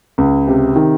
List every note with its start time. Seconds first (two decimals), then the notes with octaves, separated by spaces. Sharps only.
0.18 C#2
0.47 C3
0.76 D#3